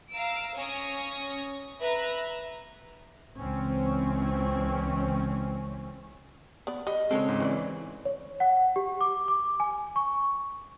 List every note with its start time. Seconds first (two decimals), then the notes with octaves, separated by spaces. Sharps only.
0.11 F5 A#5 E6 D7
0.54 C#4 C#5 D#6 A#6
1.80 B4 E5 A#5
3.39 C#2 E3 C4 C#4
6.67 B3 D5
6.87 G3 D#5
7.11 C#3 G#3 C4 A4 C#5
7.29 G#2
7.40 E3 C#4 C5 D5
8.05 C#5
8.40 F#5
8.76 G4
9.01 D6
9.28 D6
9.60 G#5
9.96 C#6